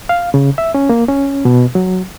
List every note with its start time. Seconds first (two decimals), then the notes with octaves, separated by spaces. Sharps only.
0.09 F5
0.34 C#3
0.58 E5
0.75 C#4
0.90 A#3
1.09 C#4
1.45 B2
1.75 F#3